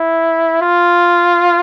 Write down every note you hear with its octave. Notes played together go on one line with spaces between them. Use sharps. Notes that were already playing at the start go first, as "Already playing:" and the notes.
Already playing: E4
F4